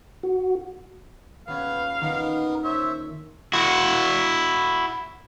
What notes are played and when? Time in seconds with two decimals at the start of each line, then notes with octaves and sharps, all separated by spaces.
0.23 F#4
1.48 D#1 B3 C#4 B4 F5 G#6
2.01 D#3 B3 D#4 A#4
2.64 C5 C#5 E5
3.53 E4 F#4